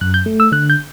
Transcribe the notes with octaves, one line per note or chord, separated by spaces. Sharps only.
F#2 F#6
G6
A3
E6
D3 F#6
G6